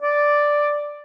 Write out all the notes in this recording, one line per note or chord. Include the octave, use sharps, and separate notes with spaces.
D5